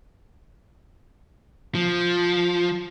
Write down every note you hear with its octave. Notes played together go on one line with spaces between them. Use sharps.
F3